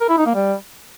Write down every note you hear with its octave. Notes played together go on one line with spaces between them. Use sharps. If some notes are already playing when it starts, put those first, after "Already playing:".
A#4
E4
D#4
A#3
G3